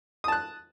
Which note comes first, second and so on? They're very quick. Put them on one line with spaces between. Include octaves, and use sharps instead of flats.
D#6 A5 F#6